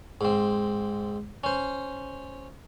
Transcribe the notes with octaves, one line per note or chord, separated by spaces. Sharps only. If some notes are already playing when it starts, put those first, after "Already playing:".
G#2 C4
C#4 C5